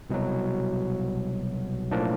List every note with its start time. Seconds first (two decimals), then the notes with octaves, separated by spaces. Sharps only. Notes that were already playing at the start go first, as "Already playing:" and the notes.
0.10 C2 B2 F#3
1.91 B1 A2 F3 A#3 D4